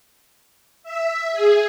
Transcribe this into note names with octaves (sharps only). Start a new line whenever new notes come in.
E5
G#4